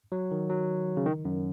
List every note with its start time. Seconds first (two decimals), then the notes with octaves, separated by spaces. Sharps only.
0.12 F#3
0.31 D#3
0.49 F#3
0.97 C#3
1.06 D#3
1.25 F#2